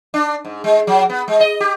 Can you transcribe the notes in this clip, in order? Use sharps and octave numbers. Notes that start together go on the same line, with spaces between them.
D4
G#2
G#3
F#3
B3
G#3
D#5
G4